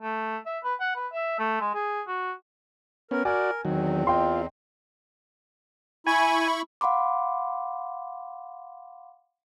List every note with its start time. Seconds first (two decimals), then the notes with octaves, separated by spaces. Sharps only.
0.02 A3
0.46 E5
0.64 B4
0.81 F#5
0.96 B4
1.13 E5
1.39 A3
1.61 G#3
1.75 G#4
2.08 F#4
3.11 B3 C#4 A#4
3.25 F#4 A#4 D5 G#5
3.65 E2 D#3 F#3 C4
4.07 F4 D#5 G5 C6
6.07 E4 G#5 B5 C#6
6.81 F5 F#5 B5 C6 D6